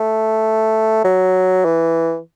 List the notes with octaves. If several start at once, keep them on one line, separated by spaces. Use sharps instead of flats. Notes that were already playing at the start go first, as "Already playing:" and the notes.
Already playing: A3
F#3
E3